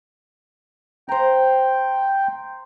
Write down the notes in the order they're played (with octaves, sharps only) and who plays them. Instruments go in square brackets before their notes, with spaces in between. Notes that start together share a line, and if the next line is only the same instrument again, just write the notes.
[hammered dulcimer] C5 A#5 [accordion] G5